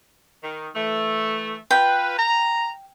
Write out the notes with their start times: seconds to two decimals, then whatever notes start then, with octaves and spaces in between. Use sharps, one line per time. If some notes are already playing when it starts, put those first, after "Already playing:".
0.43 D#3
0.75 E3 A3
1.71 F4 B4 G5
2.17 A#5